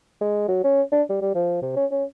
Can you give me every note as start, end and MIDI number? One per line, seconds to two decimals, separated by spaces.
0.21 0.45 56
0.48 0.61 54
0.64 0.82 61
0.92 1.02 62
1.09 1.21 55
1.21 1.32 55
1.35 1.57 53
1.62 1.76 48
1.76 1.86 61
1.91 2.04 61